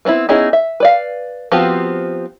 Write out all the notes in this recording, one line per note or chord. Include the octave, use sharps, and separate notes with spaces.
B3 C4 D#4 E4
B3 C#4 D#4 E4 G#4
E5
B4 D5 F5
F3 B3 C4 F#4 G4